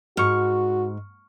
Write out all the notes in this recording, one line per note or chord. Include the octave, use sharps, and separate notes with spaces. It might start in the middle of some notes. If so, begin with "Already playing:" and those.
G#2 F#4 C#6 F6